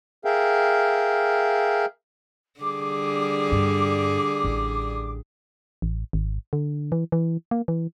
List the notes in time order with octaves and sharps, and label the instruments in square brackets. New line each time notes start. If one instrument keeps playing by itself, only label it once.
[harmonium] G#4 A#4 E5 F5 G5
[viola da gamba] D3 G3 G#4 [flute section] D6
[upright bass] G2
A1
[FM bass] A1
G#1
D3
E3
E3
A#3
E3